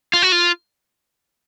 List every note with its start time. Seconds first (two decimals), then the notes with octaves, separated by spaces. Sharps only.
0.13 F4
0.22 F#4
0.32 F4